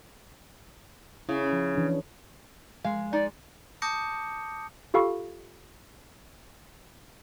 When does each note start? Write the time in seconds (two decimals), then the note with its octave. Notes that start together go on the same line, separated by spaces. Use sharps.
1.29 C#3 E4
1.53 F3
1.75 E3 D4
2.84 G#3 F5
3.13 D#4 D5
3.82 A5 D6 D#6 G6 A#6 C#7
4.94 F4 G4 A4 F5 B5 C#6